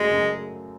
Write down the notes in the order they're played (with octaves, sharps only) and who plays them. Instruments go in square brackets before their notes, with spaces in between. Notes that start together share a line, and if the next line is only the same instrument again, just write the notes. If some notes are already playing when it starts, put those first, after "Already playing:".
Already playing: [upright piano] F#2 C#3 F#3 A3 [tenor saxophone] G#3
[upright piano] F#2 C#3 F#3 A3